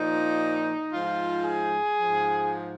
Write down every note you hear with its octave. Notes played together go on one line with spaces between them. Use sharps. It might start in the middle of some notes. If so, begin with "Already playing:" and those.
Already playing: A#2 F3 D#4
G#2 F3 F4
G#4
G#2 F3